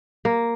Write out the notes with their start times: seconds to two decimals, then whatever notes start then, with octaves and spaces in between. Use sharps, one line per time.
0.25 A#3